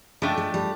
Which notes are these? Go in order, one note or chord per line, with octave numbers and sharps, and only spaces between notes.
F3 G#3 A3 D4 G4
G#3
G3